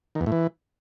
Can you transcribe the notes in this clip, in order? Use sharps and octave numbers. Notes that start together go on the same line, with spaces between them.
D#3
E2
A2
E3